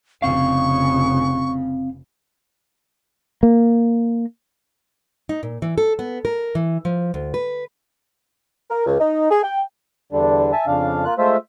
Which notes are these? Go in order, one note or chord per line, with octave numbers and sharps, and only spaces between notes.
F1 C#3 C4 F5 C#6
A#3
D#4
A#2
E3
A4
B3
A#4
E3
F3
D2
B4
A#4
C#2
D#4
G#4
G5
E2 D3 G3 D4
E5 G#5 A5
F2 C#3 D4 F5
A#3 F4 F#6
G#3 A3 F4 C5 E5